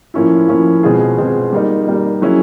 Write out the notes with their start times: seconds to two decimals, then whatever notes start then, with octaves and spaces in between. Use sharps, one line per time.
0.14 A2 F3 A#3 C#4 E4
0.48 A2 F3 A#3 C#4 E4
0.83 B2 G#3 C4 F4 G#4
1.18 B2 G#3 C4 F4 G#4
1.53 G3 A#3 D#4
1.87 G3 A#3 D#4
2.22 F#3 A#3 C#4 E4 G#4